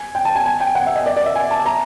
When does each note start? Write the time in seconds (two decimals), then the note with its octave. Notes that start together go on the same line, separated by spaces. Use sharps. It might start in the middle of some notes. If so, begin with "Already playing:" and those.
Already playing: G#5
0.15 G5
0.25 A5
0.36 G#5
0.46 G#5
0.60 G5
0.75 F#5
0.86 E5
0.96 D#5
1.06 D5
1.16 D5
1.26 E5
1.35 G#5
1.51 A5
1.66 A#5